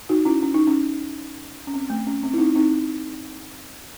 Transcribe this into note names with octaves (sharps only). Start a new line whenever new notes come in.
D#4 F#4
C#4 E4
C#4
D#4
C#4
C#4
C4
A3
C#4
C4
E4
C4 D#4
C4 D#4